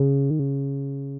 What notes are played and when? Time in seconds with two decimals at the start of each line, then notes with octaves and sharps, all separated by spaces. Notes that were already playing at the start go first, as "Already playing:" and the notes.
Already playing: C#3
0.30 D#3
0.39 C#3